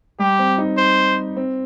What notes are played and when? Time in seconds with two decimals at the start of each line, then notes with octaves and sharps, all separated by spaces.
0.19 G3 G4
0.39 C4
0.58 D#4
0.77 C5
1.37 C4